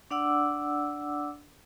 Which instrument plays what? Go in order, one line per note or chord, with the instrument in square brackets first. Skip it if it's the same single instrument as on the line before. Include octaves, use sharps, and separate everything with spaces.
[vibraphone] D4 D5 F#5 D6 E6